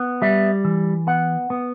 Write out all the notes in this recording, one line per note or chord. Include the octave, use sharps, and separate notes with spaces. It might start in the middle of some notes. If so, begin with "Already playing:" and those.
Already playing: B3
G3 E5
E3
B3 F#5
B3